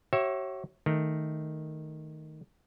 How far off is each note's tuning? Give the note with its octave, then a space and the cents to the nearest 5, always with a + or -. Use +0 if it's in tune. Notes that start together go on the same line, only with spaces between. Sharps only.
F#4 +40 C#5 -30 E5 +0
D#3 +0 A3 +0